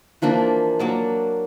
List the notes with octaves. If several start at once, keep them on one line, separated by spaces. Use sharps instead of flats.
E3 F3 A#3 D4
F#3 A#3 A5